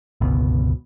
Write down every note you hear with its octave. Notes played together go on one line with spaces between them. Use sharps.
G1 C#2 B2